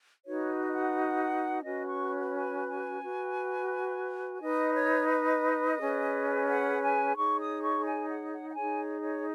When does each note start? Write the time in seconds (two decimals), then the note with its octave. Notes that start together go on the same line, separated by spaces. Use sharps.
0.25 D#4 F#4 B4 C#5
0.61 D#5
0.71 F#5
1.64 C#4 F#4 B4 D#5
1.87 C#6
2.33 G#5
2.68 G#5
3.02 F#4 B4
4.40 D#4 B4 D#5
4.74 C#5
5.09 D#5
5.78 C#4 G#4 B4
6.48 F#5
6.82 G#5
7.16 D#4 G#4 C#5 C#6
7.39 D#6
7.63 C#6
7.85 G#5
8.08 F#5
8.32 F#5
8.50 F#5
8.55 D#4 G#4 C#5 G#5
9.01 C#5